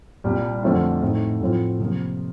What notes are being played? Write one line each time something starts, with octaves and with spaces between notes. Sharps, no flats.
C2 A#2 G3
F2 D3 A3 C4 F4
A2 A3 C4 D#4
A2 F3 C4 F4
C3 F3 A#3 F4